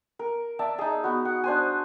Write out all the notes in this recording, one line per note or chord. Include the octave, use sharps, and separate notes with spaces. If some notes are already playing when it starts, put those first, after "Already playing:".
A#4
D5 E5 A5
D#4 G#4
B3 F#4
F#5
D4 C5 G#5